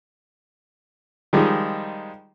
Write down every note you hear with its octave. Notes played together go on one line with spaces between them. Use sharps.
D#3 F3 G3 G#3 D#4